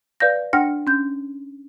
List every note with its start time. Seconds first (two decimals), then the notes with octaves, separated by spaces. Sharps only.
0.20 B4 D5 F5 G6 A#6
0.53 D4 F#5 G5 F6 A#6
0.87 C#4 G6